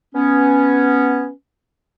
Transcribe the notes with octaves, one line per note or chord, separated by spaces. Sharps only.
B3 C#4